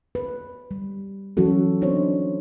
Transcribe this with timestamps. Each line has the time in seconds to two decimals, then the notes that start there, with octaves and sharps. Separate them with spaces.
0.15 B4
0.71 G3
1.37 E3 F#3 C#4 F#4 A4
1.81 B3 C4 D4 D#4 C5 C#5